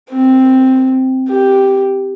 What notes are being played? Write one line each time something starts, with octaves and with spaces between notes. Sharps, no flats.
C4
G4